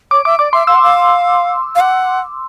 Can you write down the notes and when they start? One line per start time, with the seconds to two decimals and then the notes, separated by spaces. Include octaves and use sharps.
0.11 C#5 D6
0.25 E5 D6
0.39 D5 D6
0.53 E5 C6
0.67 F5 E6
0.75 F#5
0.83 F5
1.75 F5
1.80 F#5